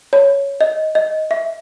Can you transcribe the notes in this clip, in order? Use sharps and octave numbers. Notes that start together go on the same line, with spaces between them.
C#5
D#5
D#5
E5